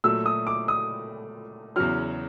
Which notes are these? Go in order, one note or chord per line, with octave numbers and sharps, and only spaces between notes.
A#2 F#3 A3 E6
D#6
D6
D#6
E2 C#3 F#3 F6